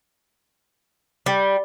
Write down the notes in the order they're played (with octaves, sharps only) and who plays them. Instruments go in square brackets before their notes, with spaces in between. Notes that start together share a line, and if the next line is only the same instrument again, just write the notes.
[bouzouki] G3